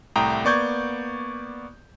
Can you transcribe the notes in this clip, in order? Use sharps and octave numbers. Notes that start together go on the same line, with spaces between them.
C2 A2 G5 A#5 D#6
A#3 B3 D5 C#6 G6 G#6